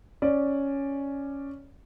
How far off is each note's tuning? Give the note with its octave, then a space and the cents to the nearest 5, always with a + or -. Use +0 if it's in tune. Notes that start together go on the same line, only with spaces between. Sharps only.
C#4 +0 D5 +0